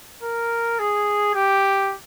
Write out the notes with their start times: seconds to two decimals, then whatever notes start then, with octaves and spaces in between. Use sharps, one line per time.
0.23 A#4
0.79 G#4
1.35 G4